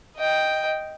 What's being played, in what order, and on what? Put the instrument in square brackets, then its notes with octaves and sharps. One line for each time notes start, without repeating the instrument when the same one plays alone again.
[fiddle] D#5 G5